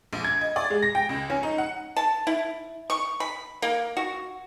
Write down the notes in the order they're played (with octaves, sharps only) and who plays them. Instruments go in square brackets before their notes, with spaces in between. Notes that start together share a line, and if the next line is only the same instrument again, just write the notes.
[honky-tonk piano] A#1
G#6
D#5
D5
G#3
A#6
G5
C#2
C#4
D#4
F#5
[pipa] A5
E4
C#6
B5
A#3
F#4